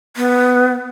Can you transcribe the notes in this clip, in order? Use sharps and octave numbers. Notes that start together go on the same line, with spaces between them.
B3